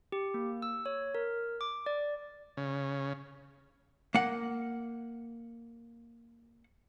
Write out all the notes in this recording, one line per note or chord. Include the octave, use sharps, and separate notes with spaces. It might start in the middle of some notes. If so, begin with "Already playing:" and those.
G4
A#3
E6
C#5
A#4
D6
D5
C#3
A#3 F#5